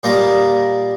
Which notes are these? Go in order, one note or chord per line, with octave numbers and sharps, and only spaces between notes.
A#2 G3 A#3 D#5 D6